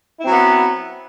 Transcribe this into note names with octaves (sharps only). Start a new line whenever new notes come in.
F#3 B3 C4 E4